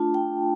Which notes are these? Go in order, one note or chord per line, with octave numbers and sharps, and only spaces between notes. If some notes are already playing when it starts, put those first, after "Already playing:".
Already playing: A3 D4 F4 A5
G5